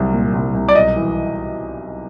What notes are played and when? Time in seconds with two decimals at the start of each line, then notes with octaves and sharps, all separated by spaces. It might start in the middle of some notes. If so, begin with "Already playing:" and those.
Already playing: C2 F#3
0.13 A#2
0.34 C2
0.55 C2
0.69 D5
0.75 B1 D#5
0.96 E3